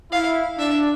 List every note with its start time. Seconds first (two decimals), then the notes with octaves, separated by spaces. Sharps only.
0.12 E4 F5
0.59 D4 E5